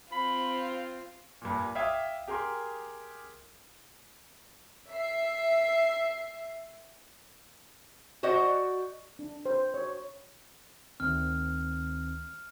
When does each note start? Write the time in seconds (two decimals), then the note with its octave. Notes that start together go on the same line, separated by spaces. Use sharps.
0.12 C4 F4 B5
1.42 G2 A#2
1.75 E5 F5 G5 D6 D#6 G#6
2.28 G4 G#4 A#4 G5 C6
4.88 E5 C7
8.23 F#4 C5 D5 D#5 F#5
9.19 D4
9.46 C5
9.74 C#5
11.00 D2 D#3 C4 F6